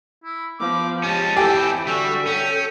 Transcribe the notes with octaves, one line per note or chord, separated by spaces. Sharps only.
E4
F3 B3 D6
G#3 C#4 G4 A5
E3 C4 G4 A4 G5 G#5
D3 G3 F#4 E5
C#4 A4 G5